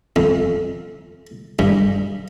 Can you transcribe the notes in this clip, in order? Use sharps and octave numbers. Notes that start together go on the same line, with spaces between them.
F2
G2